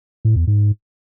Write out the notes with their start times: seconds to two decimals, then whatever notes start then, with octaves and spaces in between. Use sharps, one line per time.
0.25 A2
0.36 E2
0.47 G#2